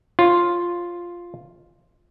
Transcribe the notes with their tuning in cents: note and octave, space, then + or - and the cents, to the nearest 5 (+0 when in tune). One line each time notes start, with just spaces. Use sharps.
F4 +0 C#5 -30